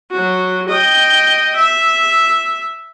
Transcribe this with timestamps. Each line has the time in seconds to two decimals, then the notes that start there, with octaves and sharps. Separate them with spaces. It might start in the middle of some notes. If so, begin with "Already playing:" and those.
0.11 F#3 F#4
0.69 D#5 G5
1.56 E5